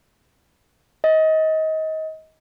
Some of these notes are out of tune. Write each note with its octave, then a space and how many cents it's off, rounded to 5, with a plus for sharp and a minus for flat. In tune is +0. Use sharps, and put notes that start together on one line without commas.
D#5 +25